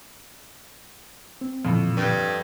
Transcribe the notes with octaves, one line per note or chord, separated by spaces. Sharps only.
C4
F2 A#2 D3 E3
G2